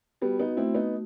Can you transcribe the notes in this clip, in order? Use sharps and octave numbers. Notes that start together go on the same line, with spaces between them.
G3 B3 F#4
B3 D#4
A3 C4 E4
B3 D#4